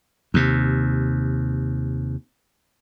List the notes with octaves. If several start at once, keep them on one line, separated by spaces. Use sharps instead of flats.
D#2 C3